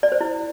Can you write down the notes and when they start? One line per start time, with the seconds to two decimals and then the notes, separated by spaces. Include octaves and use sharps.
0.03 D5
0.12 C5
0.21 E4